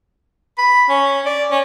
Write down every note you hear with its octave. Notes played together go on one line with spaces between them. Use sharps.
B5
C#4
D5
C#4